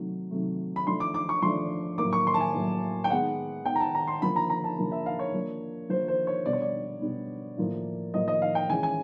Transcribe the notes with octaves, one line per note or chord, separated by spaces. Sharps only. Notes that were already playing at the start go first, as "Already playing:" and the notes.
Already playing: C3 D#3 F#3 A3
C3 D#3 F#3 A3
B5
F3 A3 D4 C6
D6
D6
C#6
F3 A3 D4 C6
A2 F#3 A#3 D6
C#6
C6
A5
G#5
A2 F#3 A#3
G5
D#3 G#3 B3 F#5
D#3 G#3 B3 G5
A#5
A5
A#5
C6
D3 F3 A#3 B5
A#5
A#5
A5
D3 F3 A#3
E5
F5
C#5
F3 A#3 D4
F3 A#3 D4 C5
C5
C#5
B2 G3 B3 D4 D5
C#5
D5
B2 G3 B3 D4
A2 F3 A#3
A2 F3 A#3 D#5
D#5
F5
G5
E3 G#3 C#4 G#5
G#5